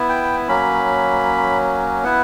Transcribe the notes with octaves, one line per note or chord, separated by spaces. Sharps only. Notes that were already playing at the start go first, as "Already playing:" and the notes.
Already playing: B3 E4
G5
F#3 A#3 C#4 B5
B3 E4 F#5